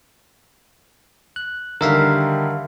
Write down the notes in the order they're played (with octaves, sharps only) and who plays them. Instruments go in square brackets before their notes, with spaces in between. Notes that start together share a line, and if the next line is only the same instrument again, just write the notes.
[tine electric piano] F#6
[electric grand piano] D3 D#3 G3 [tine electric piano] A#4 E5 F5